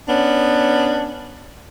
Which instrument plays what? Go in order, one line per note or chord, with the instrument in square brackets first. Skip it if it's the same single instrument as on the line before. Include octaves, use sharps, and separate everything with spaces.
[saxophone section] B3 C#4 D4